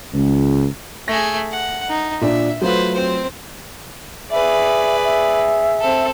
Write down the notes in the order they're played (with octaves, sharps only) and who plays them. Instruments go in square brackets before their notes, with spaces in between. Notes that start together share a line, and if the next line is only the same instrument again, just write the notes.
[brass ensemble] C#2
[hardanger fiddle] A3 G#4 [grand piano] A#6
[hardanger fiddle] F#5
D#4
[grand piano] A#2 D4 [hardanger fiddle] E5
[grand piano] F#3 A3 F4 [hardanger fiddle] B4 C5
[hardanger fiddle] C4 C5
[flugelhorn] G#4 [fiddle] B4 D5 [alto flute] E5
[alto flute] E5
[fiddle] C4 A4